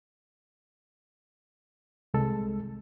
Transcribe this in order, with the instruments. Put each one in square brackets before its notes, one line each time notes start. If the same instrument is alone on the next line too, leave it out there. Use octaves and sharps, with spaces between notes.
[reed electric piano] C2 G#3 A4